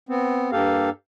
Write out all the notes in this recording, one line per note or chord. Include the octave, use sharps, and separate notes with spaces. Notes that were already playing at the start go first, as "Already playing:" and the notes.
B3 C4
G2 A#3 G4 A4 F5